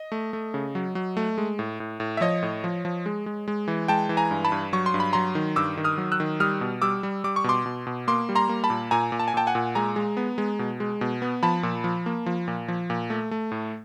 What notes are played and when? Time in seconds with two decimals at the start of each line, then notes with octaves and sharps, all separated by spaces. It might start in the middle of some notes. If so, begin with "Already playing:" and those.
Already playing: D#5
0.12 A3
0.33 A3
0.54 C#3
0.75 F#3
0.95 F#3
1.17 A3
1.38 G#3
1.59 A2
1.80 A2
2.00 A2
2.17 E5
2.21 F3 C#5 D#5
2.43 A2
2.64 F3
2.85 F3
3.06 G#3
3.26 G#3
3.48 G#3
3.68 E3
3.88 G#3 G5 A5
4.09 E3
4.17 G#5 A#5
4.31 G2
4.45 A5 B5
4.52 G2
4.73 F#3 C#6
4.86 C6
4.94 G2
5.00 B5
5.13 F#3 A#5 C6
5.35 D#3
5.56 G2 D6 E6
5.77 D#3
5.84 D#6 F6
5.98 F#3
6.12 E6 F#6
6.20 D#3
6.40 G3 D#6 F6
6.61 B2
6.82 G3 D6 E6
7.03 G3
7.24 G3 D6
7.36 C#6
7.44 B2 C6 D6
7.66 B2
7.87 B2
8.08 A#3 C6 D6
8.29 G3
8.35 A#5 C6
8.49 A#3
8.64 A5 B5
8.70 A#2
8.91 A#2 G#5 A#5
9.12 A#2
9.19 A5
9.28 G#5
9.34 A#2 G5 A5
9.47 F#5 G#5
9.55 A#2
9.75 G#3 G#5 A#5
9.96 G#3
10.17 B3
10.38 G#3
10.59 B2
10.80 G#3
11.01 B2
11.22 B3
11.43 F3 A5 B5
11.63 A#2
11.84 F3
12.06 A#3
12.26 F3
12.48 A#2
12.68 F3
12.90 A#2
13.10 A3
13.31 A3
13.52 A2